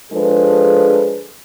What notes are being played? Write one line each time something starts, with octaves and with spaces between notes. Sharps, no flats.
F3 G#3 D4 G#4 A4 B4